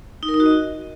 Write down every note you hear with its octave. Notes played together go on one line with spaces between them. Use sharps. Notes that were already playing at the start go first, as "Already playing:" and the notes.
D#4
A#4
D#4
F#4
D#5